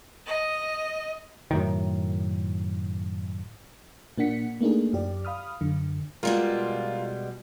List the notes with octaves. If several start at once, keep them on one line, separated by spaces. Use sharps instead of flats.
D#5
F#2 A2 D#3
A#2 A#3 D4 F#5 B6 C#7
A3 A#3 D4 D#4 G#4
F#2 G4 D5
F5 B5 D#6 F6
F#2 D3
B2 G3 G#3 F4 A#4